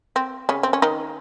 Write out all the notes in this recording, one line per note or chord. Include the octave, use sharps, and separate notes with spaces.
C4
C#3 C#4
C4
C#4
D#3 D#4